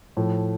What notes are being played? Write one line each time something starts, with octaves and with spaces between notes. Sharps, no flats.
A2 F3 A3